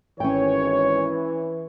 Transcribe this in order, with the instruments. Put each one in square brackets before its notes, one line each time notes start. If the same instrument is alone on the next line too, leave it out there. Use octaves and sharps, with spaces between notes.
[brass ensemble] G#1 C#5 [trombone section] E3 [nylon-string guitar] C#4 G5